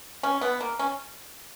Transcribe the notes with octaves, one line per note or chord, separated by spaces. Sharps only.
C#4
B3
A#3
C#4